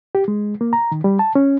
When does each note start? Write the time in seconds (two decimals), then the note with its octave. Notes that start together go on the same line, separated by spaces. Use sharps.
0.15 G4
0.28 G#3
0.61 A#3
0.73 A#5
0.92 D#3
1.04 G3
1.19 A5
1.35 C#4